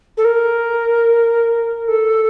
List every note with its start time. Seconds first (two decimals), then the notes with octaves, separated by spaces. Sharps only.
0.17 A4
0.25 A#4
1.88 A4